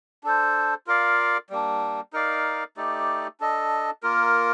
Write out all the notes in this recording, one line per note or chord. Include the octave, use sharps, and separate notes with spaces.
D4 A4 C5
F4 A#4 D5 F5
G3 A#3 D4
D#4 A#4 D5 F5
A3 D#4 G4 D5
D4 A4 D#5
A#3 F4 A#4